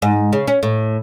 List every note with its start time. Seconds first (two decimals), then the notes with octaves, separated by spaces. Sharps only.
0.02 G#2
0.33 C#3
0.47 C#4
0.63 A2